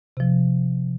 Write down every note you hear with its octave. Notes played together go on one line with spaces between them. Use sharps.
C3 F3